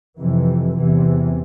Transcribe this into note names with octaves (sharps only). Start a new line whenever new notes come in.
F2 C3 E3
E2 C3 E3